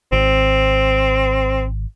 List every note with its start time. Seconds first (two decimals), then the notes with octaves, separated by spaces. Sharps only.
0.12 G#1 C4